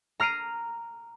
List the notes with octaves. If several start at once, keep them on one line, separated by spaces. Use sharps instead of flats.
A#5 F6 C7 D7 D#7